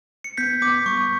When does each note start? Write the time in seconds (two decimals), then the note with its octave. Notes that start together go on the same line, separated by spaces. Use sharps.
0.24 C#7
0.37 B3 G6 B6
0.62 B3 D6
0.86 G3 C#6